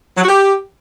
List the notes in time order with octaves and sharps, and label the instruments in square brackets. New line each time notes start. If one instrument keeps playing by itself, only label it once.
[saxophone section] F#3
F#4
G4